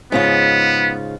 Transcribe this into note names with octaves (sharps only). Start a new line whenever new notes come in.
G#2 C#3 B3 F4